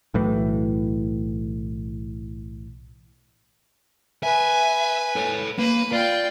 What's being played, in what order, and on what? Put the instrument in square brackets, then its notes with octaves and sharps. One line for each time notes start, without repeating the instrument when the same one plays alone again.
[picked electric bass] B1 A2 E3
[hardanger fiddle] B4 G#5 [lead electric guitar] E5
[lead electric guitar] A4 C#5
[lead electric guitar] A#3 [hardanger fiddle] B4
[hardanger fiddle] F4 G5 [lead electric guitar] D5